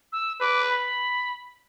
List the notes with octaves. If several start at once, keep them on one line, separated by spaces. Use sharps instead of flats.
E6
B4 D6
B5